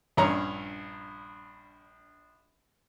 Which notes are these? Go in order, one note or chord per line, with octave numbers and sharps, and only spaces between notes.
A#1 G2 C#4 C#5 A#5